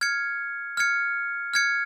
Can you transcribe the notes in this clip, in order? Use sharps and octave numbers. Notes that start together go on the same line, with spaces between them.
F6 G#6 C#7
F6 G#6 C#7
F6 G#6 C#7